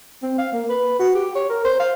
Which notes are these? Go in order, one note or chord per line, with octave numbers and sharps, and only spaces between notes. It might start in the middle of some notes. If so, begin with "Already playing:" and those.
C4
F5
A#3
B4
F#4
G4
C#5
A#4
C5
F5